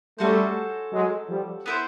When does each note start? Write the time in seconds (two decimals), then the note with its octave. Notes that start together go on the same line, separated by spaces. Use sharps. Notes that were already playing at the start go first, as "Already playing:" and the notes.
0.19 G3 A3 C#4 F#4 A4 C5
0.92 F#3 G#3
1.29 F3 G3
1.66 B3 E4 A4 C5